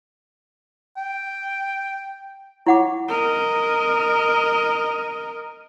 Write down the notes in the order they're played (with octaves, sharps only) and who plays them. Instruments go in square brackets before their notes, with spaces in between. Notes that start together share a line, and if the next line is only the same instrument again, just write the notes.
[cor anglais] G5
[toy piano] E4 F#5 D6 [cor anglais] C#5
[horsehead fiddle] A#4 D#5